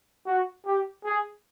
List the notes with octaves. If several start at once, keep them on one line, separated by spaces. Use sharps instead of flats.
F#4
G4
G#4